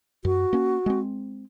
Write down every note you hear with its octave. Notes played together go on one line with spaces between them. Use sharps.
F#2 F#4
A#3 C#4
G#3 C4